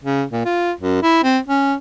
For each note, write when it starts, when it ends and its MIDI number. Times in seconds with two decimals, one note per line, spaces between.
0.04 0.24 49
0.32 0.45 46
0.45 0.72 65
0.81 0.99 42
1.02 1.22 64
1.23 1.39 60
1.48 1.74 61